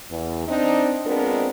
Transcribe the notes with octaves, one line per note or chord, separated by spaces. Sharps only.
E2
C4 D4 D#4
G#3 B3 C4 D4 F4 A#4